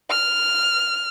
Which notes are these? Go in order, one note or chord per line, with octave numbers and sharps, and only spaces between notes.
F6